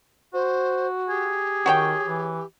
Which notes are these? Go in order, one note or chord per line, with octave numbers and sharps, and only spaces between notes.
F#4 C5
G4 G#4
D#3 F#4 C#5 G5
E3